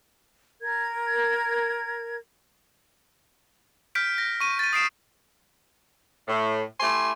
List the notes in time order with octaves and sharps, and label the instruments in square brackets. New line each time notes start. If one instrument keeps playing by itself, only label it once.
[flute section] A#4 G#6
[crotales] F6 G6 B6 D7
A#6
C#6 D#7
A6 D#7
D#6 C7 D7 E7
[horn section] A2
A3 E4 G4 G#5 C6